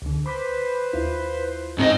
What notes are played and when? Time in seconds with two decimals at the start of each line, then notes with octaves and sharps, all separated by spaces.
0.02 C#2 D3
0.26 B4 C5 B5 D6 B6
0.93 D#2 E4 F4
1.78 G#2 C4 D#4 G#4 C5 D#5